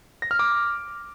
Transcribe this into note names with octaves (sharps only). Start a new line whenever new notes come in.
A#6
F6
D6